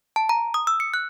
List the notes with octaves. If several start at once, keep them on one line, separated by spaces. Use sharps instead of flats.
A5
A#5
D#6
E6
C#7
F#6